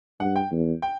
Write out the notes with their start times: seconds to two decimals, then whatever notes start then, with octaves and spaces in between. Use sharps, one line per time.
0.20 G2 F#5
0.36 G5
0.51 E2
0.82 G5